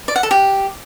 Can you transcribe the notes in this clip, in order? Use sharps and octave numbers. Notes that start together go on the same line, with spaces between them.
D5
F#5
A4
G4